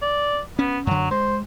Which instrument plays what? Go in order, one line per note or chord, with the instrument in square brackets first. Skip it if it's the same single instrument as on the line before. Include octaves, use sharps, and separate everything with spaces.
[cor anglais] D5
[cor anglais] B3 [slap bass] C#4
[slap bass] F#2 D3 [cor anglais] F#3
[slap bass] G#3 [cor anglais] C5